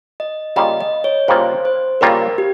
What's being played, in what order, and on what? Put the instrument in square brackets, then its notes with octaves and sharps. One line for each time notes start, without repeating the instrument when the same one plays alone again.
[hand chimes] D#5
[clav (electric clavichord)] C#3 G3 A#3 F4 [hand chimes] D#5
[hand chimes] D#5
C#5
[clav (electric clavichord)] C#3 G3 A#3 F4 [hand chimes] C5
[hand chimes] C5
[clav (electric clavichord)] C#3 G3 A#3 F4 [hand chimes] A#4
[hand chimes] G4